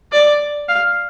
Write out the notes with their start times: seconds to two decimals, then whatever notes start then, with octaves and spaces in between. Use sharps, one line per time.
0.12 D5
0.69 F5